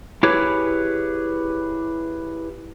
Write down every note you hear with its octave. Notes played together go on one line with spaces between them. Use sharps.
E4 G4 G#4 B4 C#5